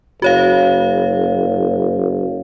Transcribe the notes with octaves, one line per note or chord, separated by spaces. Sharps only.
F#1 F#4 C#5 F5